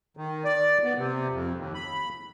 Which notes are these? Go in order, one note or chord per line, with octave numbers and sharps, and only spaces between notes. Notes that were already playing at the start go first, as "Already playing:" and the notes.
D#3
D5
B3
C3
F2
D#2
B5